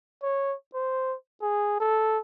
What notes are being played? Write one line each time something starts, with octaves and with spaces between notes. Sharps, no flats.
C#5
C5
G#4
A4